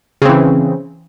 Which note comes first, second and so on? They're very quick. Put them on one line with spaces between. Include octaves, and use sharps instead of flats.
C#3 C4 E3